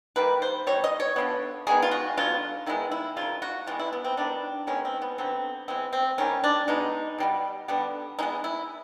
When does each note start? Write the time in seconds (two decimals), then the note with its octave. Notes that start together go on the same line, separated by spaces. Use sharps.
0.16 D#3 G3 A#3 B4
0.42 C5
0.67 B2 G3 C#5
0.84 D#5
1.00 C#5
1.16 D3 F3 G#3 B3
1.67 D#3 G#3 B3 G#4
1.82 F4
1.91 F#4
2.17 D3 F#3 B3 F4
2.66 D#3 G#3 B3 E4
2.91 E4
3.16 C#3 F3 A#3 F4
3.42 F#4
3.67 C3 E3 G#3 B3 F4
3.79 E4
3.93 B3
4.05 C4
4.17 D#3 G3 B3 D4
4.67 D#3 G#3 B3 C#4
4.85 C4
5.02 B3
5.18 D3 F#3 B3 C4
5.68 E3 G#3 B3 C4
5.93 C4
6.18 D#3 G3 A#3 C#4
6.44 D4
6.68 B2 G#3 B3 D#4
7.18 B2 G3 B3
7.68 D3 G3 B3
8.19 E3 G#3 B3 D#4
8.44 E4